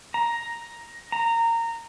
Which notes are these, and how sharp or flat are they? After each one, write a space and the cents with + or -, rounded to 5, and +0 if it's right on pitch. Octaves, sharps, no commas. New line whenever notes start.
A#5 +5
A#5 -20